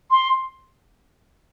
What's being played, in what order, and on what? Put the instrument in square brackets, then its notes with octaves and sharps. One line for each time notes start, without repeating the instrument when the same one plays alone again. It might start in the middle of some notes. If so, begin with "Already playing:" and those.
[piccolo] C6